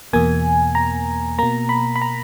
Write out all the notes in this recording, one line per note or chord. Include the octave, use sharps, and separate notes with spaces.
E2 B2 A#3 G#5
A#5
B2 A#3 A#5
B5
B5
A#5